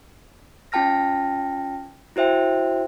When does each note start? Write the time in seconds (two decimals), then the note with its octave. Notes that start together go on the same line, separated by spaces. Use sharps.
0.72 C#4 F4 G5 A5 F6 A#6
2.16 E4 F#4 C5 E5 G5